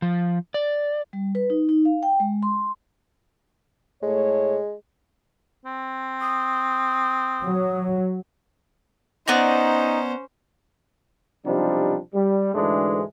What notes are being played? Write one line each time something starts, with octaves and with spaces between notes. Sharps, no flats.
F3
D5
G3
B4
D#4
D#4
F5
G5
G#3
C6
A2 G#3 A3 C#5
C4
D#6
F#3
B3 C#4 D#4 C5 D5 A#5
B1 C3 F3 G3 D4 D#4
G3
D2 G#2 E3 G#3 A3 D4